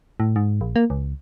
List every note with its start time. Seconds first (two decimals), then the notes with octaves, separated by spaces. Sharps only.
0.20 A2
0.36 G#2
0.61 A#1
0.76 A#3
0.90 C#2